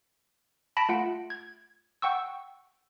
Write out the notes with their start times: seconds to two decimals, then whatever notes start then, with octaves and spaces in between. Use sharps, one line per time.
0.77 A5 B5 A#6 B6 D7
0.89 A3 F4 F#5 D7
1.30 G#6
2.02 F#5 G5 C#6 E6